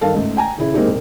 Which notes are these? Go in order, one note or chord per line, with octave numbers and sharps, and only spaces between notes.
G2 D#3 A4 A#4 F5 A5
C#2 G#2 A3
G5 G#5 A#5
D#1 C#3 E4
G#3 A#3 C4 D#4 G4
E1 C2